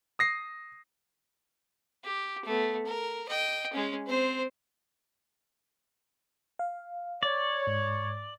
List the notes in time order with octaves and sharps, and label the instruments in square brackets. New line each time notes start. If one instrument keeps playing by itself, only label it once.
[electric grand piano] D#6 A#6 C7
[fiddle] G4
A3 B3
A#4
D#5 G5
G#3 C#4
C4 C5
[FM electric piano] F5
[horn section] C#5 [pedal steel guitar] D5
[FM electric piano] G#2